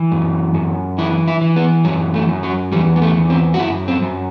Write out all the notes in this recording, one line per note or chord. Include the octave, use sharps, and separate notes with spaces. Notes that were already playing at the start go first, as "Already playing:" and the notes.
Already playing: E3
F#2
F#2
E3 E4
E4
E3
B3
F#2 F#3
A3
F#2
F#3
E2 G3
B3
A3
E2
C4
F#4
F#2 E4
C4
F#2